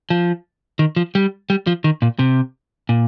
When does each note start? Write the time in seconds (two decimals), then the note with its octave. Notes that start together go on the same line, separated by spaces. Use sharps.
0.10 F3
0.79 D#3
0.96 F3
1.15 G3
1.50 G3
1.67 F3
1.84 D#3
2.02 A#2
2.19 C3
2.89 A#2